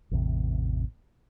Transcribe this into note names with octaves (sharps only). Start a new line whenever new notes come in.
A1 E2 C3